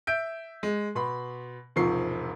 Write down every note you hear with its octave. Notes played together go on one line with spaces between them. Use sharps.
E5 G6 D7
G#3
B2 B5 C6
E1 G#2 C3 F3 C#6 C7